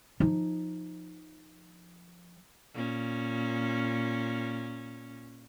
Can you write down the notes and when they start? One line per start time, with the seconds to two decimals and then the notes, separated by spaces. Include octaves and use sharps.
0.20 F3 D#4
2.74 A#2 C#4